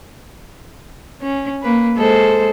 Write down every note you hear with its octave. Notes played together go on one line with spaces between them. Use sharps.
C#4
A#3 B4
G#3 A4 C5